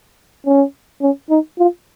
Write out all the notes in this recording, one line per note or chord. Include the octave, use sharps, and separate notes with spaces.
C#4
C#4
D#4
F4